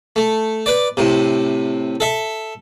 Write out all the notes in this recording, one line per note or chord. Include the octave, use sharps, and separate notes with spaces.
A3
B4 D5
A2 C3
A4 E5